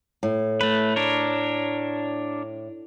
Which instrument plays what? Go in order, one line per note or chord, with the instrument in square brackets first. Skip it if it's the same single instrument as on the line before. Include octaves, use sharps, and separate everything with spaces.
[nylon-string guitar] A2
[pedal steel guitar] A3 B4
D4 A#4 C#5